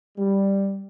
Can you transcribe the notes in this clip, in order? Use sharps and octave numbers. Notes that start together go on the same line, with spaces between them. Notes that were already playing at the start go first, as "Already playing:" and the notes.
G3